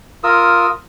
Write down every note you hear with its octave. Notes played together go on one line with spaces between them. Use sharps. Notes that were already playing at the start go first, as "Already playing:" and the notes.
F4 A#4 D#6 E6